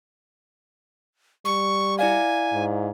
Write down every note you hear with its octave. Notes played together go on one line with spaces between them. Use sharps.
G3 C#6
E4 D5 F5 G#5
G#2